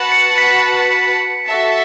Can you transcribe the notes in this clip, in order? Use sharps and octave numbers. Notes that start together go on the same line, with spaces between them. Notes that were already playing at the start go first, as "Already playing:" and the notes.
Already playing: F#4 B4 F#5 A5
C#7
B6
F#4 A4 E5 A5